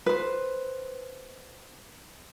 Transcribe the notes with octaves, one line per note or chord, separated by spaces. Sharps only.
B4 C5